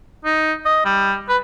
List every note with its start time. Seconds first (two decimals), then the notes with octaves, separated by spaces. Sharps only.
0.25 D#4
0.66 D#5
0.85 G3
1.29 B4